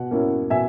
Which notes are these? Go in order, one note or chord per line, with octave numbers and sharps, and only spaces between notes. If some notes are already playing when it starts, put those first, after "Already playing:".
Already playing: B2 F#5
A#3 C#4 E4
B2 E5 G#5